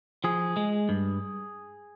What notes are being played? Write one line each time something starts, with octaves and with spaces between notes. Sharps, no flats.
F3 G#4
G#3
G2